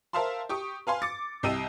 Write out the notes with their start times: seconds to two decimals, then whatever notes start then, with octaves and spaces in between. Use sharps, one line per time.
0.13 A#4 C5 E5 F5 A5 C6
0.49 G4 C#6 D#6
0.87 B4 F5 G#5 C6
1.02 D6 A6 C#7
1.43 C2 G4 D#5 E6 D#7